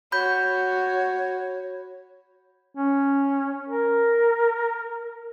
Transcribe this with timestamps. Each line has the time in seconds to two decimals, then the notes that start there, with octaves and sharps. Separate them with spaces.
0.12 F#4 C#5 B5 G6
2.75 C#4
3.68 A#4